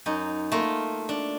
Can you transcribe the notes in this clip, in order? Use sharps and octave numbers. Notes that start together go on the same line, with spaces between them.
F#2 D#4
A3 A#3 F4
D4